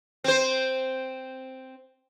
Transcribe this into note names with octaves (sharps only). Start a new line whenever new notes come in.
C4 C5